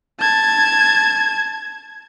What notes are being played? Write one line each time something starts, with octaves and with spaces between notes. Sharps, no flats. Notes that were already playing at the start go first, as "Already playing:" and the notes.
A5 G#6